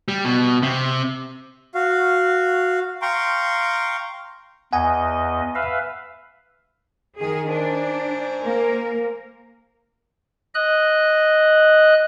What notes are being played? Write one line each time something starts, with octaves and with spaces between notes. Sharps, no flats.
G3
B2
C3
F#4 F5
F5 G5 A#5 C6 C#6
E2 D#5 F#5 G#5
B4 E5 F5
D#3 G#4
D4 C5 G#5 A#5
A#3 A#4
D#5 F#6